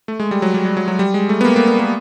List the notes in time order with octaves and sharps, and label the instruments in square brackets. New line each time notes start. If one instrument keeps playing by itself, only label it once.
[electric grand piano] A3
G#3
G3
F#3
G3
G3
F#3
F#3
G3
G#3
A3
B3
A#3
A#3
B3
A#3